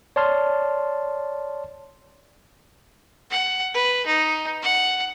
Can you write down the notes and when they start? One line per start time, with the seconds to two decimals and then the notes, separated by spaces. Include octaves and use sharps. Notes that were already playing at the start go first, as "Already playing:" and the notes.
0.16 C#5 D5 A5 C6 F6
3.31 F#5
3.74 B4
4.06 D#4
4.62 F#5